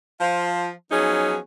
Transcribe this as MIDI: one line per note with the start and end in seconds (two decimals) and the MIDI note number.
0.20 0.69 53
0.20 0.69 72
0.20 0.69 77
0.91 1.36 53
0.91 1.36 54
0.91 1.36 59
0.91 1.36 61
0.91 1.36 63
0.91 1.36 68